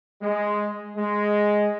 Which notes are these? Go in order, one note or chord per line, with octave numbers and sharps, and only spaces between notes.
G#3
G#3